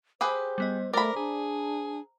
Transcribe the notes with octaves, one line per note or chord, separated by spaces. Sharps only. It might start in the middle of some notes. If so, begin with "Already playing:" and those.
G4 G#4 B4 C5
G3 B3 D#5
A3 A#4 C5 D5 A#5 B5
D4 G#4